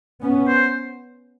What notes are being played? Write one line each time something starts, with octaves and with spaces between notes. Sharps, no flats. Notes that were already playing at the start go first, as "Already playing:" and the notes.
B3 C#4
C5